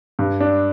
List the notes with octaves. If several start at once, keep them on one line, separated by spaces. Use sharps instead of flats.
G2
D4